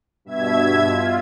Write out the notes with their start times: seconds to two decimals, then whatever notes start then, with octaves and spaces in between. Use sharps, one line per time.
0.25 G2 B2 E5 G#6
0.87 F4